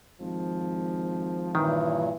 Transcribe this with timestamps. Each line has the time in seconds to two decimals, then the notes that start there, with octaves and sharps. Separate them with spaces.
0.20 G#1 F3
1.55 G2 A#2 D#3 E3 F#3